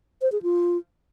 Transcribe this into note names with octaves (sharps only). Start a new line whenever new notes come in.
C5
G#4
F4